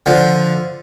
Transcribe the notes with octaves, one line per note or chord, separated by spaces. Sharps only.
D3 F3